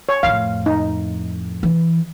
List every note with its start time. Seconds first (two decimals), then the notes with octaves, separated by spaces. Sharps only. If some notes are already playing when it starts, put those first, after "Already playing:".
0.09 C#5
0.23 F2 A2 F5
0.66 D#4
1.63 E3